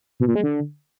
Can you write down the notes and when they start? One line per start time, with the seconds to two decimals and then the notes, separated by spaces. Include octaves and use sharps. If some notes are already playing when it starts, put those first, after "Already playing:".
0.20 B2
0.28 A#2
0.36 G#3
0.43 D3